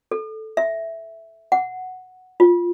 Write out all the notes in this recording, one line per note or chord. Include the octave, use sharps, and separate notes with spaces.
A4
E5
F#5
F4